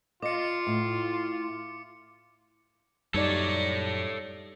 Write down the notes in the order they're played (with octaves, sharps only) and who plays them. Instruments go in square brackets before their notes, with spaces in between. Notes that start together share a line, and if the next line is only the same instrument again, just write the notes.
[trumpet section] F4 [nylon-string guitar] D#5 [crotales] D6 C#7
[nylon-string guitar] A2
[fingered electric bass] F#2 [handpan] G3 D#4 D5 [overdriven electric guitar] A4 C#5